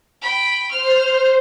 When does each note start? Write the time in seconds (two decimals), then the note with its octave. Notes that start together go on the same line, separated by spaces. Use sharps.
0.21 G5 B5
0.70 C5 F6